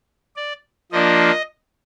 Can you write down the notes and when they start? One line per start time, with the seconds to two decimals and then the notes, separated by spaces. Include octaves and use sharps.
0.36 D5
0.92 F3 A#3 D4 D#5